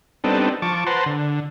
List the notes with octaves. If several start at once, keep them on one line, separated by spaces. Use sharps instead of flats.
G3 B3 C4 D4 D#4 A4
F3 A5 C#6 D6
B4 C5 F#5 A5 A#5 C6
D3